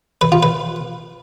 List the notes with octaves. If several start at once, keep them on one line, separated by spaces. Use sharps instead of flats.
B4
F4
B4